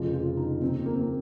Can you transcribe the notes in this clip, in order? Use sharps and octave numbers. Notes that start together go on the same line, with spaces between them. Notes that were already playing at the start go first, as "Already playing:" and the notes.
Already playing: F1 F2 C#3 F3 F4
F4
D#4
D#2 C#3 F3 C4
A#3
C4
A#3